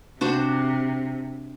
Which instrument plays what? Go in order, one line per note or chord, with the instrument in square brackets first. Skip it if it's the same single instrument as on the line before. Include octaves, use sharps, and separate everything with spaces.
[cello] C3 [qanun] D4 F#4 C5